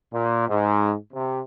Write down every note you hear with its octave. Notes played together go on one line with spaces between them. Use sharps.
A#2
G#2
C3